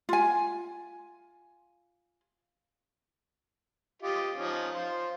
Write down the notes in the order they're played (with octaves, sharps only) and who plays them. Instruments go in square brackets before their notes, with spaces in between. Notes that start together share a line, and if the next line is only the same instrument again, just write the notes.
[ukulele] F4 G#5
[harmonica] F4 G4 D#5
F3 C#4 D#4
F4 C5